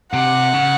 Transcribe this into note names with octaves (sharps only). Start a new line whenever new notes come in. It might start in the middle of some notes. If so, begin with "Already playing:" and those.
C3 F#5
C#3